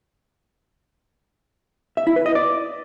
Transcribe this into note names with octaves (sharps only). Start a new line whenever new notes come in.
E5
E4
B4
D#5
D5